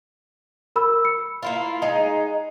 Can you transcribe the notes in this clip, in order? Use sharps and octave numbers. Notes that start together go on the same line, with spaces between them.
A#4 B5 E6
C#7
A#3 E4 F4
G#3 D#4